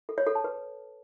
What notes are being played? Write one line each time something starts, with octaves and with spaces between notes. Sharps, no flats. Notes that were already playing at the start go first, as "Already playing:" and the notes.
A4
C#5
A4
A5
B4